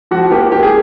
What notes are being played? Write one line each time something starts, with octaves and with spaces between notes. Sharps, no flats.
F3 F#4
A#3 G4
A#3 G4
G#4